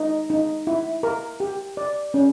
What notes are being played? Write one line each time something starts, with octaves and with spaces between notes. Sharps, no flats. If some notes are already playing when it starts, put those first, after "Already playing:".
Already playing: D#4
D#4
E4
A#4
G4
D5
C#4